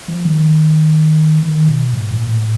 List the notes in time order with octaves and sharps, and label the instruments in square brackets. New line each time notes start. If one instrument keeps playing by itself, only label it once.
[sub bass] F3
D#3
D#3
B2
G#2
A#2
A2